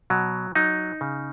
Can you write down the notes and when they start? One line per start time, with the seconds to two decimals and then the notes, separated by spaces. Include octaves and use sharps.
0.10 B2 F#3
0.55 F#3 D#4
1.01 C#3